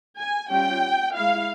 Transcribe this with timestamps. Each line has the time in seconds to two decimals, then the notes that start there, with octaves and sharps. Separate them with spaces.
0.18 G#5
0.50 G3 C#4 F4 G5
1.15 G#3 E4 F5